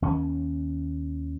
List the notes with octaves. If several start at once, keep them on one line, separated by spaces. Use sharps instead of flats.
D#2 C#4